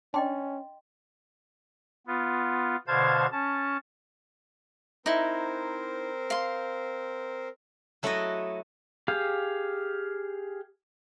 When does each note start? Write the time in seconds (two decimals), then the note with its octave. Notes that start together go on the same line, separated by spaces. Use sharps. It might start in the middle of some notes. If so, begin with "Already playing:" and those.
0.14 C#4 D4 D#5 G5 C6
2.07 B3 F4
2.88 B2 D3 C5 F5 A5 G#6
3.32 C#4 A5
5.06 C4 D#4 E4 A#4 C5
6.30 F5 C6
8.03 F#3 A3 E4 F#4 A4 D#5
9.08 G4 G#4 F5